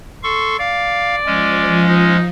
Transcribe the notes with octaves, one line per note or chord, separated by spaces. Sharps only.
A4 C6 C#6
D5 F5
F3 G#3 C#4
D#4